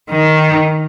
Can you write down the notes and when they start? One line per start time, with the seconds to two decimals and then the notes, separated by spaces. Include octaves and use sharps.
0.10 D#3